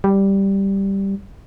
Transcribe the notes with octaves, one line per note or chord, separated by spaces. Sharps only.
G3